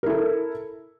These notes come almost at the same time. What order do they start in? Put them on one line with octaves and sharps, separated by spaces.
A#4 E4 A4